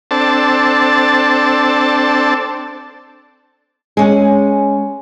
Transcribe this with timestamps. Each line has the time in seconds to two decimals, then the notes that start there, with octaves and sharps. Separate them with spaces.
0.11 C4 D4 A4 A5
3.97 G#3 C#4